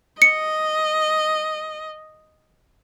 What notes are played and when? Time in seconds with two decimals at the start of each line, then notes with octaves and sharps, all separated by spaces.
0.22 D#5 C#7